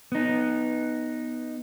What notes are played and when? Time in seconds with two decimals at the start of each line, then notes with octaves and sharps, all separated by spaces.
0.12 B3 D#4